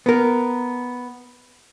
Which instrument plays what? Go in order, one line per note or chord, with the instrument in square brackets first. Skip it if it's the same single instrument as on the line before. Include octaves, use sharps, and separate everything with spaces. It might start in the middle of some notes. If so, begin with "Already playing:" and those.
[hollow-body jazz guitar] B3 A#4